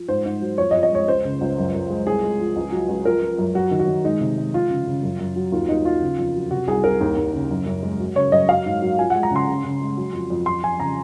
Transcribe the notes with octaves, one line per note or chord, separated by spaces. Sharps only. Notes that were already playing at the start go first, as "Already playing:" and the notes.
Already playing: F3
G#2 C5
G#2
F#3
F2 C#5
D#5
F2
D#5
G#3 C#5
C#2 C5
C#3
C#2
F#2
F#2
G#3
C2 G#4
G#3
F3
C#2
F#3
C#2
F3 A#4
F3
F#2
F#3 F#4
D#3
F#4
D#3
G#3 D#4
C3
G#3
F3 F4
C#3
C#3
F#2
F#2
F#3
D#2 F4
D#2 D#4
F#3 F4
C#3
F2
F#3
C3 F#4
C2 G#4
C2 A#4
D#2
D#2
C#3
F#2
F#2
G#3
F#3
C#3 C#5
F#2 D#5
F#3 F5
G#2
F#3
F3 G#5
G#3 F#5
A#5
C#3 C6
C#3
C#3
G#3
F#3
F2
F2
F2 C6
F3 G#5
C#3 A#5